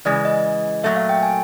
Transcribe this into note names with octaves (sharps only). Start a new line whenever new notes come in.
C#3 E3 G#3 D5
D#5
A#2 F#3 A3 E5
F5
G5
G#5